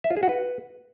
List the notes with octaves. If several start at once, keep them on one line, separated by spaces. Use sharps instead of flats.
E5
F4
G#4
F#4
B4